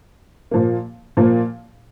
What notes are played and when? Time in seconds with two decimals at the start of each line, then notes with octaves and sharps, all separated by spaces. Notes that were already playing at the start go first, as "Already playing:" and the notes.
0.51 A#2 F3 A#3
1.17 A#2 F3 A#3